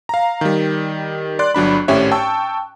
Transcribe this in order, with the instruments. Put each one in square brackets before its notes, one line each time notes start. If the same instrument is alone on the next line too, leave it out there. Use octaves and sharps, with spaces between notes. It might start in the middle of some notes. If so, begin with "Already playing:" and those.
[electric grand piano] F5 A#5
D#3 G3
D5 C6 F#6
G1 F#3 D4 B5
G#1 A2 C#4 G4 C#5 E5
G5 A5 C#6 E6